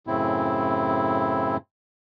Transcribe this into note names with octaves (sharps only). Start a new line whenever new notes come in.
F#2 A2 C#3 C4 E4